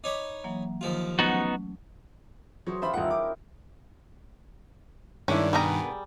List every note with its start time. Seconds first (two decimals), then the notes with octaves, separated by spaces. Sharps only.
0.04 D#4 C#5 B5 D6
0.44 E3 F#3 A#3
0.81 D#2 F3 F4
1.19 F#3 A3 B3 C#4 D#4 F#4
2.67 F#3 G#4 C5 C#5
2.82 C#4 F4 G4 C5 E5 B5
2.94 D#1 D#4 E4 A#4 F#5
3.11 D6
5.28 G2 D#3 G#3 C#4 D4 E4
5.53 B2 G3 B3 G#4 A#4 A#5